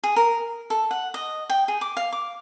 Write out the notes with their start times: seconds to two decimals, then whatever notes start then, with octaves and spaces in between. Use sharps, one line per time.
0.04 G#4
0.16 A#4
0.70 A4
0.91 F#5
1.14 D#5
1.50 G5
1.68 G#4
1.81 D6
1.97 F5
2.13 D6